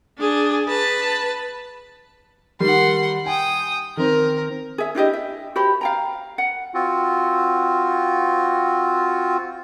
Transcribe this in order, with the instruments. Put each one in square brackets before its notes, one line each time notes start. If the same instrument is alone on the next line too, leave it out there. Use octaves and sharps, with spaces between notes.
[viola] D4 G#4
B4 A5
[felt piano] D#3 G3 [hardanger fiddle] F#5 C6
[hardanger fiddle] G5 D#6 [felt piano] G#5
[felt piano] D#3 C4 [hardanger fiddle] A#4
[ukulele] G#4 E5
D4 E4 G4 D#5
E5
F#4 G4 C5 B5
F5 G5 A#5
F#5
[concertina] C4 F4 F#4